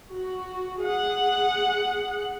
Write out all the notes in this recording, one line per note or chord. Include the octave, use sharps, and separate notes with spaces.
F#4
G#4 F#5